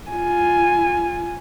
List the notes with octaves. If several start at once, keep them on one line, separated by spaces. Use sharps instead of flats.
F4 G#5